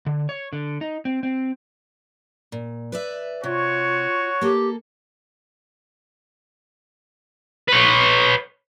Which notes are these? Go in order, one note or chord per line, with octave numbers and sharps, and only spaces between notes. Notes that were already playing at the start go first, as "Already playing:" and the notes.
D3
C#5
D3
D#4
C4
C4
A#2
B4 D5 E5
C3 F4 F#4 C#5
A#3 G4 A4
B4 C#5